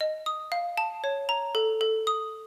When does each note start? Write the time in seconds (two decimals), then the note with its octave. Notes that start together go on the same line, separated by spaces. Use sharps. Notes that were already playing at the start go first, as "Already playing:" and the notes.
0.01 D#5
0.26 D#6
0.52 F5
0.77 A5
1.04 C#5
1.29 A#5
1.55 A4
1.81 A4
2.07 D#6